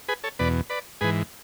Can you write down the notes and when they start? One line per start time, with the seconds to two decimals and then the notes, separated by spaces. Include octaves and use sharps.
0.09 G#4 B4
0.24 A4 C#5
0.39 E2 B2 B4 D5
0.70 B4 D5
1.01 G#2 E3 G#4 B4